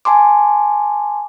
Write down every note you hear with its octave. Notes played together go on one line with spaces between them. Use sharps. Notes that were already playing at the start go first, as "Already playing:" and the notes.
G#5 A5 C6 D6